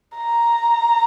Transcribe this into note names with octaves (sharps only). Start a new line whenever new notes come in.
A#5